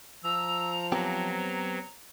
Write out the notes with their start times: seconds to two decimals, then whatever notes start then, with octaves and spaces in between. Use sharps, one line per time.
0.24 F3 A#5 E6
0.92 F#3 B3 C4 G4 A#5